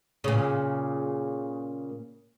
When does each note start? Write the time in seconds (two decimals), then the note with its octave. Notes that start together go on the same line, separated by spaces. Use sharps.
0.24 A#2 C#3